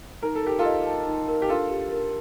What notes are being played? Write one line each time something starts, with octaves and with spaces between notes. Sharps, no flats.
D#4 A#4
A4
G4 A#4
F4 A4
D#5
A5
D#4
A#4
G4
D4 F4 A4
G4
A#4